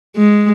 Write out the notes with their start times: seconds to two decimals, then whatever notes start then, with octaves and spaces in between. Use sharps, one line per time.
0.17 G#3